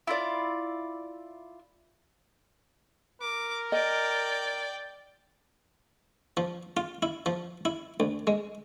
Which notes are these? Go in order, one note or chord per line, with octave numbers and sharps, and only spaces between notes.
E4 F4 D5
A#4 D6
D5 D#5 G5
F3
F4
E4
F3
E4
D2
G#3